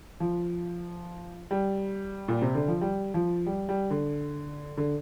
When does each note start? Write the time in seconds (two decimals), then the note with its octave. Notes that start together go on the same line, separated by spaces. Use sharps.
0.20 F3
1.51 G3
2.28 A#2
2.42 C3
2.55 D3
2.68 F3
2.81 G3
3.14 F3
3.46 G3
3.69 G3
3.90 D3
4.77 D3